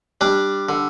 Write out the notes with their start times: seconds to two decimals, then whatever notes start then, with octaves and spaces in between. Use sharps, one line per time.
0.21 G3 D4
0.69 D3